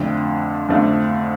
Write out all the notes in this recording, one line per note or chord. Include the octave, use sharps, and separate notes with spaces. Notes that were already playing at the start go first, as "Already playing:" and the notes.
Already playing: F2 D3 F3 A3 D4
F2 D3 F3 A3 D4